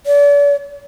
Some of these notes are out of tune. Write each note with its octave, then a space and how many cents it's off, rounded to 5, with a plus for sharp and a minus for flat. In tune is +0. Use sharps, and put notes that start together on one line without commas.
D5 -40